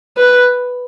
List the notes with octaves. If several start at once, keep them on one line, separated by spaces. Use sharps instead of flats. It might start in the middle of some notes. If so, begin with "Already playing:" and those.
B4